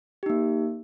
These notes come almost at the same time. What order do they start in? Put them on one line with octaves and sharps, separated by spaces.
G4 D#4 A#3